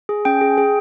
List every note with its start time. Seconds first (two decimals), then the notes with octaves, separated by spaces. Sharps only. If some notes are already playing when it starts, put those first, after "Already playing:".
0.09 G#4
0.25 C#4 G5
0.41 G#4
0.58 G#4